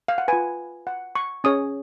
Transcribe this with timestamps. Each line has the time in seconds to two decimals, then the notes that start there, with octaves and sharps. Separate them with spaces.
0.08 F5
0.18 F#5
0.28 F4 B4 G#5
0.87 F#5
1.15 C#6
1.44 C#4 G#4 C#5 D#6